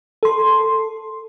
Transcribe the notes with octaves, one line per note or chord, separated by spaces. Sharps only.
A4 C6